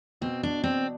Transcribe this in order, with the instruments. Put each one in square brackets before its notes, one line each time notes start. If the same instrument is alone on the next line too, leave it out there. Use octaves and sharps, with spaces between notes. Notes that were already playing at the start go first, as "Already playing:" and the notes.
[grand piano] B2 [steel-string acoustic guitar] C4
[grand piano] B2 [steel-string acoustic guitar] D4
[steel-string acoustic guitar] C4 [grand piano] D4